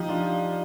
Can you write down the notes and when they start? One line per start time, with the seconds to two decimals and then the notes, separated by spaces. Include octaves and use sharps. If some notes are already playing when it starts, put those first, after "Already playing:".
Already playing: F3 D#4 G4
0.09 D4 F4